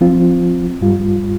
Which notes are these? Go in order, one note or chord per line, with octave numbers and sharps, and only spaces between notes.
F3 C4 F4
G2 G3 F4